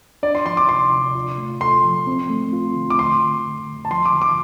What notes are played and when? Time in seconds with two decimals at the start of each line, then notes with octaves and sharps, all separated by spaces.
0.23 D4 D5
0.35 C6
0.46 F3 C6
0.57 D6
0.69 C3 C6
0.92 C3
1.15 F4
1.38 A3
1.61 A4 C6
1.84 F3
2.07 C4
2.30 A3
2.53 F4
2.76 D3
2.90 D6
2.98 A3 C6
3.22 D3
3.45 F2
3.68 F2
3.85 A5
3.91 F3 C6
4.06 D6
4.13 D3
4.21 D6